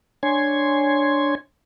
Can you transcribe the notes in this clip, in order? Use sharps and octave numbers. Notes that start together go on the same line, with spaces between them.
D4 C#5 G#5 C6 G#6